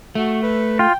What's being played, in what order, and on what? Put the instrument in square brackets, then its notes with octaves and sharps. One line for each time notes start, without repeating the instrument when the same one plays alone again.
[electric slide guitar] A3 [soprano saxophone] F#4
[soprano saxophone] B4
[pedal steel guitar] F4 [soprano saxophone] G5